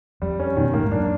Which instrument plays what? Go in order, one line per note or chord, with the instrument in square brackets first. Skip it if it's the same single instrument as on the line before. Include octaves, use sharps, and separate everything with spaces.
[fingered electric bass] F2 [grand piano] G3
[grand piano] C#4
[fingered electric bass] B2 [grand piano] D#3
[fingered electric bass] A2 [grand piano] A#3
[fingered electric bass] G#2
[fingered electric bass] F#2 [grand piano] D4